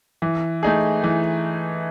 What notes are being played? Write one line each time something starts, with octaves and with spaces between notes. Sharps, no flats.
E3
A3 D#4 G#4
E3